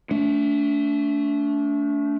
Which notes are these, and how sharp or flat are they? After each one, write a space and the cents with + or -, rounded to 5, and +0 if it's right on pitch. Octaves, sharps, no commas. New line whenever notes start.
A3 +0 D4 -35